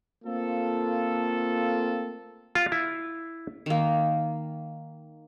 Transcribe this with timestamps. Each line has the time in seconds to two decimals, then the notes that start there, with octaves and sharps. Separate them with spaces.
0.23 A3 A#3 C4 F4 A4
2.55 F4
2.72 E4
3.66 D#3 A#3